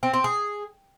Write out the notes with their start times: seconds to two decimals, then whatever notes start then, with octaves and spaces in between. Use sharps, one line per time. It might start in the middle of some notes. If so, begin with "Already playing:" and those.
0.03 C4
0.13 C4
0.24 G#4